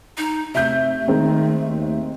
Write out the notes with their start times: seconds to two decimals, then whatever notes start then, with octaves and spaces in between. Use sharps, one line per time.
0.17 D#4
0.55 C3 A3 E5 G6
1.08 D#3 G#3 C4 A#4
1.67 D#2